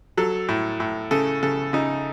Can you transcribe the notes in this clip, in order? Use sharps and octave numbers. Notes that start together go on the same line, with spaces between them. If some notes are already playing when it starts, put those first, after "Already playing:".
F#3 A4
A2
A2
C#3 A4
C#3 A4
C#3 D#4